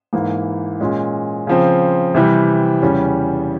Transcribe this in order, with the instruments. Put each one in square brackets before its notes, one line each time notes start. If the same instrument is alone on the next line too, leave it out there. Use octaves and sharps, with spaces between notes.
[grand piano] G#2 E3 A#3 E4
A#2 G#3 C#4
C#3 F3 C4
C3 E3 G3
E2 C#3 G3 C#4